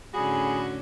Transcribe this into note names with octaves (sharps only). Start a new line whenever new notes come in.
A2 D3 C#4 F#4 G#4 B5